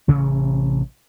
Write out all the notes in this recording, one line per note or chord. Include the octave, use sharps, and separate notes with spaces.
A1 C3 E3 C#4